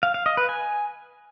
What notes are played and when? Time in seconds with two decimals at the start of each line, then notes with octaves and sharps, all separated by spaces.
0.03 F5
0.14 F5
0.26 D#5
0.37 B4
0.49 G#5